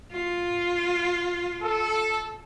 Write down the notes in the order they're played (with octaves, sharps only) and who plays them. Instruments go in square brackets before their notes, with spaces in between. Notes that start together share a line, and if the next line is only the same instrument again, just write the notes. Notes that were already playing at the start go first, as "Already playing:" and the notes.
[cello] F4
[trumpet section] A4